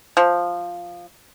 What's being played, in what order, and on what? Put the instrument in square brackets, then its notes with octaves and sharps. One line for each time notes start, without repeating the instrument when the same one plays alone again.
[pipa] F3